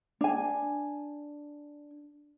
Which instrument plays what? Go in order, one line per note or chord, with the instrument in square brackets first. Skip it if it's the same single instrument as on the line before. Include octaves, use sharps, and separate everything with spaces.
[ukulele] D4 G#5